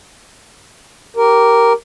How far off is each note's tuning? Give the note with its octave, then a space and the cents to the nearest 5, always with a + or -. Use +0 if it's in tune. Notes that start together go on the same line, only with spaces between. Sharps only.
G4 -10 A#4 +0